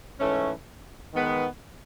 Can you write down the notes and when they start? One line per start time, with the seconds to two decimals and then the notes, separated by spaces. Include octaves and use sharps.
0.19 G#2 E3 A3 C#4
1.12 D#3 G#3 B3